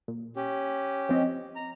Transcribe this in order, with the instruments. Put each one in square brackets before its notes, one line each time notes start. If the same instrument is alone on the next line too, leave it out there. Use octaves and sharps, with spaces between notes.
[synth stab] A#2
[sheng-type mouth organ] C#4 G4
[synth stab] F3 C4 D#5
[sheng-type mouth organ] A#5